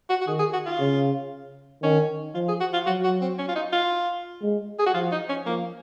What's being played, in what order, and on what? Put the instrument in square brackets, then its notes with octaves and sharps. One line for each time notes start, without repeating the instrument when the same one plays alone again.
[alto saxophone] F#4
F#4
[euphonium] D#3 [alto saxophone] G#4
[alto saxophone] G#4
F#4
F4
[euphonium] C#3
[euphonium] D#3 [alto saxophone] C#4
[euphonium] F3 [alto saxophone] F4
[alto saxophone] G#4
F#4
F4
[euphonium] F#3 [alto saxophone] F#4
[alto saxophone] F#4
C4
C#4
F4
D#4
F4
[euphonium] G#3
[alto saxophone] G#4
F#4
[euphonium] F3 [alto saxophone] F4
[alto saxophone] D#4
C#4
[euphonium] F3 [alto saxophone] A#3